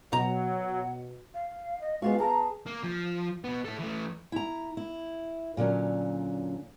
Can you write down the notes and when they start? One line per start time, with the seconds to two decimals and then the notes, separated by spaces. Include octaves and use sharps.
0.13 B2 F#3 F#5 A#5
1.34 F5
1.81 D#5
2.02 G#3 B3 F4 F#4 F5
2.20 G#4 A5 A#5
2.67 A#3
2.84 F3
3.44 B2 B3
3.64 E4 A4
3.79 E3 A3
4.32 E4 A#5
4.77 E4
5.57 A#2 D3 F#3 C#4